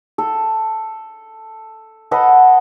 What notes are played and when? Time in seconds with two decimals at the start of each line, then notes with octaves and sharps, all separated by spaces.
0.18 A4
2.11 A4 B4 D#5 F#5